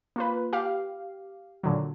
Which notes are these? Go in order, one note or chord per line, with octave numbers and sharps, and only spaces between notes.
A#3 F4 B4
G4 F5
A#2 D3 F#3